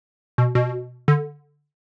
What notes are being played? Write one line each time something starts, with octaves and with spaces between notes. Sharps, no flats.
B2
B2
D3